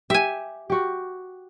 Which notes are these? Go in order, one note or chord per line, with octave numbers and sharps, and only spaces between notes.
G4 E5 G#5
F#4 G4